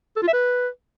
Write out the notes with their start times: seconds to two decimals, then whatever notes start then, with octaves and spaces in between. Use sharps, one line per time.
0.17 A4
0.22 F4
0.28 E5
0.33 B4